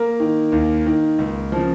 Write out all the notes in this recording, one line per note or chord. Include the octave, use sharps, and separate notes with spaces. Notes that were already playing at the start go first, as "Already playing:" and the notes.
Already playing: A#3 A#4
D#3
D#2
D#3
C#2
C#3 F3